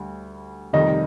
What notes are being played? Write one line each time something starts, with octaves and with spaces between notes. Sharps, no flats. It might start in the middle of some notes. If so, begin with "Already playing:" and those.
Already playing: D2 G3
F1 F2 D#3 G3 D#4